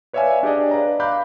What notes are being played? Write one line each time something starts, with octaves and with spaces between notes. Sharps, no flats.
B4 C#5 D5 E5 F5 G#5
D4 G4 G#4 D5 D#5
B4 D5 F5 A#5
F5 A#5 B5 D6 F#6 G6